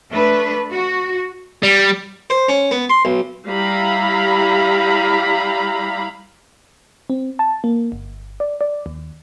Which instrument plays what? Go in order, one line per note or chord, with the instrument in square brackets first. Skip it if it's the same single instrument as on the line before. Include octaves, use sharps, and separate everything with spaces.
[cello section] A3 D4 B4
F#4
[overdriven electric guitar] G3
[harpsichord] C5
C#4
B3
C6
B1
[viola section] G3 E4 F5 A#5 B5
[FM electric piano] C4
A5
A#3
G1
D5
D5
D#2